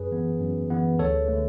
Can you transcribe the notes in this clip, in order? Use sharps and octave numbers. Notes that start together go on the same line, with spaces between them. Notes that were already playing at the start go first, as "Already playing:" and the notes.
Already playing: F#2 G#4 B4
E3 B3
F#2
E3 B3
D2 A4 C#5
D3 A3